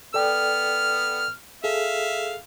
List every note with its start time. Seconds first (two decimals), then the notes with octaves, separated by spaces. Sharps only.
0.14 B3 A4 D5 G5 F6
1.64 G#4 A4 E5 F5